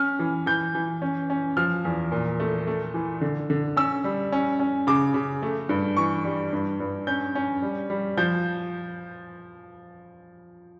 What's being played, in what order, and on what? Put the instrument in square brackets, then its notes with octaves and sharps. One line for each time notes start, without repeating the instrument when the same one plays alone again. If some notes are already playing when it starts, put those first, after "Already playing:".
Already playing: [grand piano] C#4 F6
E3
E3 G6
E3
C#4
C#4
F3 F6
E2
A#2
A3
A3
E3
D3
D3
C#4 E6
G3
C#4
C#4
C#3 D6
C#3
A3
G2
E3 C#6
G3
G2
G2
C#4 G6
C#4
G3
G3
F3 G6